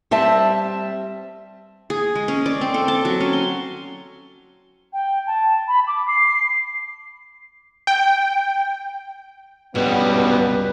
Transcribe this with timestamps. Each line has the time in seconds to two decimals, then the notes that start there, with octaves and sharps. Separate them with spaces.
0.11 G3 C4 E5 A5
1.90 G#4
2.15 G#3
2.28 C#4
2.46 D5
2.61 C4
2.74 A4
2.88 A5
3.05 F#3
3.20 C#4
3.33 C6
4.93 G5
5.27 A5
5.68 B5
5.88 D6
6.08 C7
7.87 G5
9.75 C#2 G2 B2 G3 B3 B4